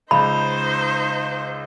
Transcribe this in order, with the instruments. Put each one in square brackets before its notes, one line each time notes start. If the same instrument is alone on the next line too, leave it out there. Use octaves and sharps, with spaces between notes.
[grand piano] C#2 [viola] D#4 C5 [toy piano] B5